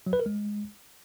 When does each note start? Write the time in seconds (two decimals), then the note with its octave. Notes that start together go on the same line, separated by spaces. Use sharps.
0.06 F#3
0.13 B4
0.19 A#4
0.26 G#3